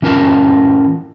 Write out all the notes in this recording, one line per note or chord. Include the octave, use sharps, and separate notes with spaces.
E3 C#4 F4 A#4 A5